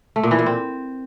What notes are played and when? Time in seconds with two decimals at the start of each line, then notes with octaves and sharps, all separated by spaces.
0.16 A3
0.23 A#2
0.31 E3
0.39 A#2
0.46 C4